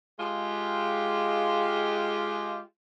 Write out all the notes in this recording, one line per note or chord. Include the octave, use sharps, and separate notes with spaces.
G#3 F4 G4